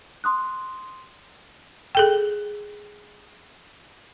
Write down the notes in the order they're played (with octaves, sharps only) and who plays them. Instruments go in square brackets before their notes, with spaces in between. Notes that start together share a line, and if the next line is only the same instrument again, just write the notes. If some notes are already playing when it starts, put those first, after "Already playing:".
[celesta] C6 D#6 F#6
[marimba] G#4 A4 G5